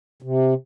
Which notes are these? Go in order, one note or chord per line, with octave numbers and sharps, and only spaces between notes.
C3